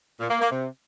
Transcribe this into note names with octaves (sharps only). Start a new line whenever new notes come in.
A#2
A#3
A#3
C3